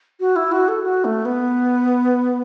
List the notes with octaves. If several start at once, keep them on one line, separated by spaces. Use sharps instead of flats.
F#4
E4
F#4
A4
F#4
A3
B3